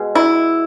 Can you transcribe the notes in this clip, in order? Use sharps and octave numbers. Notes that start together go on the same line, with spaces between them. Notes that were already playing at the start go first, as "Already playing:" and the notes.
Already playing: B2 G#3
E4